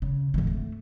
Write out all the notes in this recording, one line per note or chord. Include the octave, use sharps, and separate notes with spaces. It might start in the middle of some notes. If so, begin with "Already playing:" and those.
C#3
G#2 E3
D3 A3